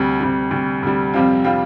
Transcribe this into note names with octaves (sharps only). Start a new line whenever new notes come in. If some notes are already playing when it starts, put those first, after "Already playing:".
Already playing: D2 C3 G3
D2 C3 G3
D2 C3 G3
D2 C3 G3
F2 C3 G3 C4 F4
C3 G3 C4 F4